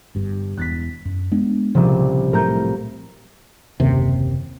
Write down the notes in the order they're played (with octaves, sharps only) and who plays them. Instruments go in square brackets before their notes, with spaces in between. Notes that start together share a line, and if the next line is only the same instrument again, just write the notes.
[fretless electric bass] G1 G2
[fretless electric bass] E1 E2 [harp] F#6 A6 B6
[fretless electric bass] F#2
G#3 B3 D4
[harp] C2 A#2 F3 [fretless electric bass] C#3
[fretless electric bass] A2 F#3 A3 [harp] A#4 A#5 G6
[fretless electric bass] F#1 D#2 C3